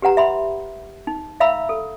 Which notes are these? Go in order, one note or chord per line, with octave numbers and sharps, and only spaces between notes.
G4 B4 F#5 A#5
E5 B5 C6
D#4
E5 F5 A#5 B5 E6
A4